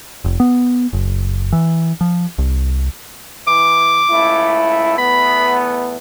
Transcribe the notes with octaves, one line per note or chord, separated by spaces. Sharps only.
F1
B3
F#1
E3
F3
C2
E3 D6
C#2 A3 E4
E2 A3 B3 B5